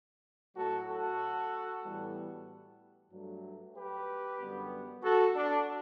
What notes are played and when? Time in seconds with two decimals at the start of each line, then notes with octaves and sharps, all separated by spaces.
0.56 A2 F#3 A3 F#4 A4
0.87 F#4 A4
1.84 A2 E3 G3 B3
3.12 G2 F#3 A3
3.75 G4 B4
4.39 F#2 D3 G3 B3
5.03 F#4 A4
5.35 D4